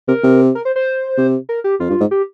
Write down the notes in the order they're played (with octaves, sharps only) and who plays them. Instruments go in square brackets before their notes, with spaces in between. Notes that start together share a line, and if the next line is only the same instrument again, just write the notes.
[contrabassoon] C3 [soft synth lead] A#4
[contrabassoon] C3
[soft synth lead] A#4
C5
C5
[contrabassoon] C3
[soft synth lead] A#4
G4
[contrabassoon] F2 [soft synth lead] F4
[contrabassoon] G2
G#2
[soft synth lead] G4